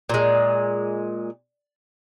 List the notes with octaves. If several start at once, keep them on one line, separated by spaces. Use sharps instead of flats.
A#2 G#3